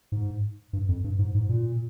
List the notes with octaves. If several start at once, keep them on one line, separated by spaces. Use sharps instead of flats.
G#2
G2
F2
G2
G#2
G#2
A#2